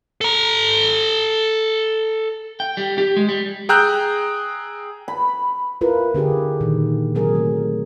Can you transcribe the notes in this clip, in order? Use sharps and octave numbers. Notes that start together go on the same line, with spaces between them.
A4 A#5
G5
G3
G4
G#3
G3
G#4 G5 A#5 E6 F#6 G6
B5
E4 F4 A#4 B4
D3 D4 G4 G#4
A#2 D#3
C3 F#3 G#4 A#4
A3